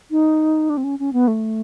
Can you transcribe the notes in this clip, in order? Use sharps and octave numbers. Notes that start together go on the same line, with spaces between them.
D#4
D4
C4
C#4
C#4
B3
A3